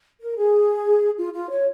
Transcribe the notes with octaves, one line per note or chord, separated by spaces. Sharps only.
A#4
G#4
F4
F4
C#5